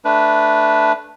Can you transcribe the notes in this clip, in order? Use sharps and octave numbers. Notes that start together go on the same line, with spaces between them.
A3 D4 B4